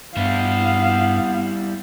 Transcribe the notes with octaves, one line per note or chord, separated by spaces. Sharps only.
G2 G3 B3 E4 F5